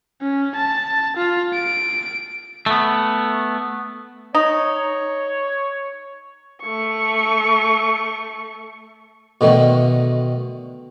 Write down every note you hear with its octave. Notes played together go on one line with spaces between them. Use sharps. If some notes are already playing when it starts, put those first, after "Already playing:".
C#4
A5
F4
D7
A3 B3
D#4 C#5
A3 C#6
B2 D3 D#3 A3